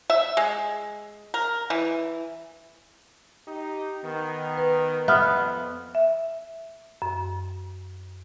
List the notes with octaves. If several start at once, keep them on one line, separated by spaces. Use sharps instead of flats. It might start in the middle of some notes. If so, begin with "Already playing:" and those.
E5
G#3
A#4
E3
D#4 G4
D#3 B3
B4
F2 B3 E5 F6
E5
F#2